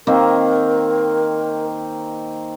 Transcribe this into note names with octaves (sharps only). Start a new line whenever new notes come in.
D#3 A#3 C4 A#4